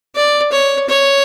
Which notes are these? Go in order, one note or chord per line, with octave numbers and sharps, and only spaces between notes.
D5
C#5
C#5